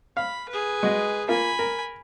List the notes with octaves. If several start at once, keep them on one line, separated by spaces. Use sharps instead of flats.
F5 B5
G#4 B4
G#3 F#4
A#3 F4 G#5 B5
A#4